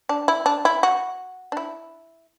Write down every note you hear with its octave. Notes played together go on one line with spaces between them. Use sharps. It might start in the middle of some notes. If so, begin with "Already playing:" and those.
D4
E4
D4
E4
F#4
D4
E4